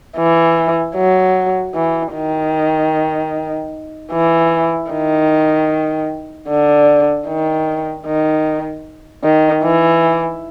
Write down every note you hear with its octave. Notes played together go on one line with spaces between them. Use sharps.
E3
F#3
E3
D#3
E3
D#3
D3
D#3
D#3
D#3
E3